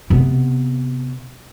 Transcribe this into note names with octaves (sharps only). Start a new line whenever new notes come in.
C3 B3